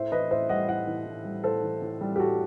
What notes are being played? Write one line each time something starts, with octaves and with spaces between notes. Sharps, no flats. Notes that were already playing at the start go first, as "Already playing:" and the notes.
Already playing: A2 C5 E5
E3 B4 D#5
A2 C5 E5
G3 D#5 F#5
A2 D#5 F#5
E3
A2
G3
A2 A4 C5
E3
A2
G3
G4
A2 F#4 A4